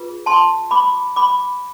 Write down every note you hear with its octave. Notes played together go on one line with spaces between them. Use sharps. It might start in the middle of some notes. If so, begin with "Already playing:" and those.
Already playing: F4 G#4 B4
A5 C6
B5 D6
B5 D6